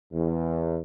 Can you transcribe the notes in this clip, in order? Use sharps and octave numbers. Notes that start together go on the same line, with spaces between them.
E2